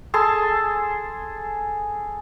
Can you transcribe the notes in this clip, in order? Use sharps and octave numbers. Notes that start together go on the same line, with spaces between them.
G#4 A4 A5 C6